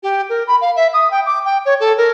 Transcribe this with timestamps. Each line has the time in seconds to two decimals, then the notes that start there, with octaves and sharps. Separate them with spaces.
0.03 G4
0.29 A#4
0.47 B5
0.61 F5
0.76 E5
0.93 D#6
1.10 G5
1.26 D6
1.45 G5
1.65 C#5
1.80 A4
1.97 A#4